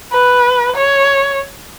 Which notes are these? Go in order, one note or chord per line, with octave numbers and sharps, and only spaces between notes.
B4
C#5